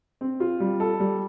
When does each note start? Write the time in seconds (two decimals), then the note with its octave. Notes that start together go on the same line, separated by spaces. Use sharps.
0.21 C4
0.40 F4
0.60 G3
0.80 A4
1.00 G3